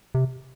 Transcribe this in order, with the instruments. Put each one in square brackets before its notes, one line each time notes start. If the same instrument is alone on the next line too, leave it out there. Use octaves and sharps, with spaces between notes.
[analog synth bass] C3